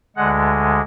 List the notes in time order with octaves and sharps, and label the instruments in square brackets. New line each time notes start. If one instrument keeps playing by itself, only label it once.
[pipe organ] D2 D3 G#3 F#5